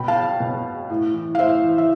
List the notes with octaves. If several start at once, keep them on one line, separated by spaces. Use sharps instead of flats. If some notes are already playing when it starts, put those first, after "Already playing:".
Already playing: B2 G5 B5
F5 A5
B2
A2
E3
F5
A2 C5 E5
E3
E5